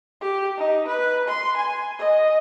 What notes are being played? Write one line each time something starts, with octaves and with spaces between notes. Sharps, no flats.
G4
D#4
B4
C6
G#5
D#5